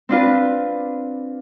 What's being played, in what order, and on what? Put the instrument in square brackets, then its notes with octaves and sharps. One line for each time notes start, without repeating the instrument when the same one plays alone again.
[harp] C4 D4 F4 B4